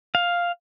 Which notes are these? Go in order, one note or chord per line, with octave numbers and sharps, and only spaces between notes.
F5